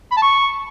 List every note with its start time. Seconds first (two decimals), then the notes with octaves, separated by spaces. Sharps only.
0.12 B5
0.17 A5
0.22 C#6